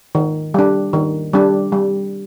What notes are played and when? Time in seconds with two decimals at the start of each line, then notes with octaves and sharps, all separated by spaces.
0.15 D#3
0.54 G3 D4
0.93 D#3
1.33 G3 D4
1.72 G3